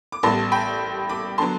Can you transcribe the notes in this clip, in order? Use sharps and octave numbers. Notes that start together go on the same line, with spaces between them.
D6
A1 A2 G3 B3 A5 C6
G5 B5
B5 D6
D3 F#3 B3 A5 C6